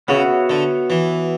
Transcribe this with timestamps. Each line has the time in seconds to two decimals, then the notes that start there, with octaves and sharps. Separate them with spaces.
0.08 C#3 B3 F#4 C#5 E5
0.50 D3
0.90 E3